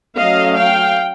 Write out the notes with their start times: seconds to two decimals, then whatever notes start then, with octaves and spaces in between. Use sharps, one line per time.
0.18 F#3 A3 C#4 D#5 F5
0.56 F5 G5